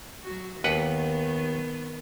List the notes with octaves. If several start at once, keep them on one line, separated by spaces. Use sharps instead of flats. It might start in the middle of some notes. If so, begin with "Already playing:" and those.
F#3 F#4
D#2 D#3 B3 B4 F#5